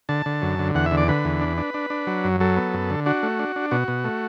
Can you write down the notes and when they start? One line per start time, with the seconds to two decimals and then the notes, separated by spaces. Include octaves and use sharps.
0.09 D3 A5
0.26 D3
0.42 F#2
0.59 D3
0.75 E2 F#5
0.86 E5
0.91 D3
0.97 D5
1.08 D3 B4
1.25 E2
1.41 D4
1.57 D4
1.74 D4
1.90 D4
2.07 F#3
2.24 F#2
2.40 F#3 A4
2.57 B3
2.74 F#2
2.90 D3
3.06 D4 F#4
3.23 A3
3.39 D4
3.56 D4
3.71 B2 F#4
3.88 B2
4.04 A3